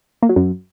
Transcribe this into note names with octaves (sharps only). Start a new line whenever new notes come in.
A#3
F#3
F#2